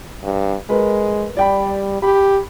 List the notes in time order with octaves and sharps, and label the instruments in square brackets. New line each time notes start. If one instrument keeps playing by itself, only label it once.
[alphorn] G2
[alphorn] G#3 [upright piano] A#4 B4
[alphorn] G3 [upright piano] D5 G5 B5
[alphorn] G4 [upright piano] B5